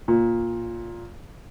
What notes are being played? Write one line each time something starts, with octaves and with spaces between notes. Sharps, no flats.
A#2